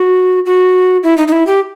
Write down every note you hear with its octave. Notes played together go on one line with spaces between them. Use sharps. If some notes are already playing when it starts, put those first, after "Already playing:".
Already playing: F#4
F#4
E4
D#4
D#4
E4
G4